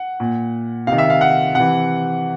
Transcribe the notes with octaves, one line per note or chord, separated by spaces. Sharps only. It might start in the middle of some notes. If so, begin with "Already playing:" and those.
Already playing: F#5
A#2
C3 D#3 F5
E5
F5
F#5
C3 E3 F#5